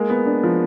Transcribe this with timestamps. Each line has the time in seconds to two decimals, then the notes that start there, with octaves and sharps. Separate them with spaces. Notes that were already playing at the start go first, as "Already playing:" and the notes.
Already playing: G#3 A#3
0.10 B3
0.26 D4
0.43 F3